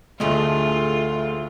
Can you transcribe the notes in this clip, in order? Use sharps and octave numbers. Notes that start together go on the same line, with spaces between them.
D2 A2 A3 F4 G#4 D#5